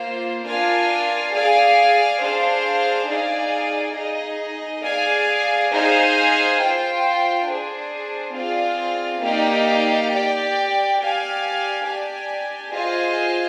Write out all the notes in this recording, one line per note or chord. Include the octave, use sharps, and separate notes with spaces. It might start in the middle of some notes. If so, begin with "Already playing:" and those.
Already playing: A#3 F4 C5
D4 F4 A#4 F5 G#5
G#4 D5 F5 G#5
D4 G#4 C5 F5
D#4 G#4 D5 F5 G#5
D#4 G#4 D#5
G#4 D5 F5 G#5
D#4 G#4 C5 F5 G#5
F4 C5 G5
D4 G#4 C5
C4 F4 G#4 D5 F5
A#3 D#4 G4 D5 F5
G4 D5 G5
G4 D5 F5 G#5
D4 G4 D5 G#5
F4 G#4 C5 D#5 G#5